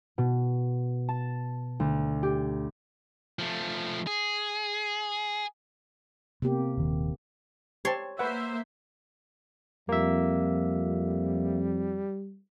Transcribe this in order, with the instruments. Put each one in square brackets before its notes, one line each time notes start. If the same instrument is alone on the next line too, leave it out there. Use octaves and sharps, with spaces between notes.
[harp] B2
A5
D2
G4
[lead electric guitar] F3 A3
G#4
[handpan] C3 A#3 G4 [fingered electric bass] B3
[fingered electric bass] D#1 D#3
[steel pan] G4 A5 [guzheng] C#5 C6
[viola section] A#3 C5 E5 [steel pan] B4 F#5
[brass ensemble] F2 [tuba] G3 [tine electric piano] A#3 E5